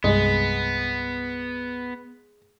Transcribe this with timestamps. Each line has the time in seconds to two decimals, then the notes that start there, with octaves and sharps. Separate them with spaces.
0.04 C2 G2 G#3 B3